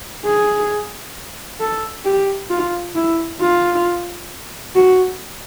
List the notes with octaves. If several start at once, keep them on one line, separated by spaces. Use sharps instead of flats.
G#4
A4
G4
F4
E4
F4
F#4